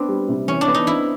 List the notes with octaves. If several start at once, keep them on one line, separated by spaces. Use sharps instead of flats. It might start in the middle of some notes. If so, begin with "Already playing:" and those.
Already playing: B3 C4 D4
G3
C3
E3 C#4
D4
B3
D#4
C4 E4